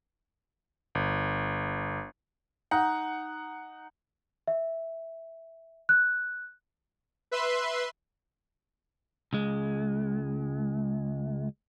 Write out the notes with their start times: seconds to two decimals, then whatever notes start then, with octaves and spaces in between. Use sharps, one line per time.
0.95 G1
2.71 D#4 F#5
4.48 E5
5.89 F#6
7.31 B4 E5 C6
9.33 C#2 G#3